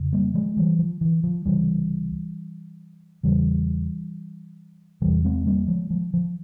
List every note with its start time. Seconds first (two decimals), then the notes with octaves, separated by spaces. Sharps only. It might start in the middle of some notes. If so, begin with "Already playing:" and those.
Already playing: F2 C#3
0.13 G3 A#3
0.34 F3 G#3
0.57 E3 G3
0.79 F3
1.01 E3
1.24 F3
1.45 C#2 C3 E3 G3
3.23 E2 C#3 E3 G3
5.02 E2 C3 E3 G3
5.25 G#3 C4
5.46 G3 A#3
5.68 F3 G#3
5.90 F3
6.14 F3